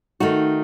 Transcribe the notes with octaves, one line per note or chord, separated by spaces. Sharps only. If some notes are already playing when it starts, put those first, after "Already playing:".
D#3 A3 D#4 F#4